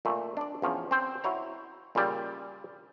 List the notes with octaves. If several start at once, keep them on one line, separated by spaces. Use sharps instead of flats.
A#2 A3
D4 D5
E2 F3 C#4
C4 C5
E4 F#4 C#5 A#5
A#2 C#3 G3 D5